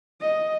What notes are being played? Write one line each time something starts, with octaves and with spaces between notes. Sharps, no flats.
D#5